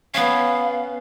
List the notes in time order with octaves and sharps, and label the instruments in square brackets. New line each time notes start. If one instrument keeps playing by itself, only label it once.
[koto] B3 C#4 [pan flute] F5